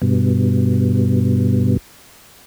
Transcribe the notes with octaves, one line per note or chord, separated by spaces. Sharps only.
G2 B2